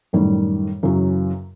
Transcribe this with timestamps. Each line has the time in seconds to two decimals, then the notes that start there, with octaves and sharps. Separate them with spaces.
0.13 F#2 A2 D#3 G3
0.83 F#2 C#3 E3 F#3